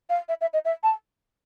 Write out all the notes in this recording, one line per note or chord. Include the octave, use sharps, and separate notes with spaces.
F5
E5
E5
D#5
E5
A5